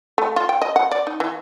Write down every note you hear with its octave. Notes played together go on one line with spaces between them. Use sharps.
A3
F4
G5
D#5
F#5
D5
D#4
E3